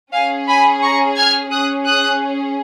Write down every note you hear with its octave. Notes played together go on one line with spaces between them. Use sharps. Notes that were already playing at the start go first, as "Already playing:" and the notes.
C#4 G#4 F5 G#5
G#5 B5
A#5 C#6
F6 G#6
C#4 G#4 D#6 F#6
D#6 F#6